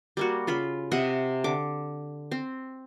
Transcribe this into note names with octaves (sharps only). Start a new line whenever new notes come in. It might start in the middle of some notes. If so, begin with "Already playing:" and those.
G3 A#3 F#4
C#3 F4 B5
C3 D#5 E5 F#5
D3 D6
C4